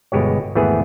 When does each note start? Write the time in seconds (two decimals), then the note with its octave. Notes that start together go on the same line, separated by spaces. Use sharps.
0.12 G1 B2 G#3 G4 C#5
0.55 G#1 E2 E3 A3 B3 G#4